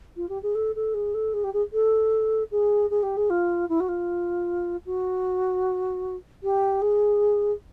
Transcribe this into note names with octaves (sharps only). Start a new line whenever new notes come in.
F4
G4
G#4
A4
A4
G#4
A4
G#4
G4
G#4
A4
G#4
G#4
G4
G#4
F4
E4
F#4
F4
F#4
G4
G#4